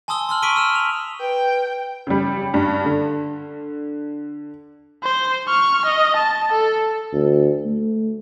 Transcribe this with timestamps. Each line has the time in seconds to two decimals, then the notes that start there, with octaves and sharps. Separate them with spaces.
0.08 G#5 A5 C6 D#6 E6 G7
0.29 C6 E6 F6 F#7
0.42 A#5 C#6 B6 D7 D#7 G7
0.56 E6 F6 E7
0.75 F7
1.21 B4 G5
2.07 C#3 G3
2.54 G2
2.85 D3
5.04 C5
5.48 C#6 F6
5.85 D#5
6.17 A5
6.52 A4
7.13 D2
7.65 A3